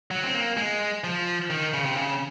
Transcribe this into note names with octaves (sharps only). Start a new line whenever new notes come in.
F#3
C4
A#3
G#3
F3
D#3
C#3
C3
C#3